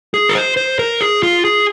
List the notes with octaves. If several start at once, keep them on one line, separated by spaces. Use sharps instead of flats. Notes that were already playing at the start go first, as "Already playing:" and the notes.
G#4
A#4
C5
C5
A#4
G#4
F4
G#4